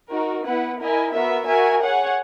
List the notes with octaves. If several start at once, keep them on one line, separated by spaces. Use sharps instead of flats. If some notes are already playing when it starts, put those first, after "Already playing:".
D#4 F#4 A#4
B3 E4 B4 F#5
E4 A#4 D#5 G#5
B3 F#4 A#4 E5
F#4 A#4 E5 G#5
G#4 C#5 F#5